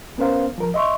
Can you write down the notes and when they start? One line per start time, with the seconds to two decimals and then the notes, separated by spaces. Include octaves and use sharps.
0.18 B3 C#4 A#4 C5 F5
0.58 F3 A#4
0.74 D#5 E5 C6 C#6